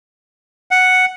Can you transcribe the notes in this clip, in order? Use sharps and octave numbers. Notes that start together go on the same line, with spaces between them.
F#5